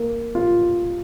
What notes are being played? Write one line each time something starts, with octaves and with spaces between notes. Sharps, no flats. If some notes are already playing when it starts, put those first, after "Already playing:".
Already playing: A#3
F4